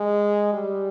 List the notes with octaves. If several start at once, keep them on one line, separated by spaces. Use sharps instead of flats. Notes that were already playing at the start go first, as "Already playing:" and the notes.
Already playing: G#3
G3